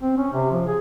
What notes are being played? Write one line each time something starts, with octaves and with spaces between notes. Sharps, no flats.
C4
C#4
C3
F3
G#4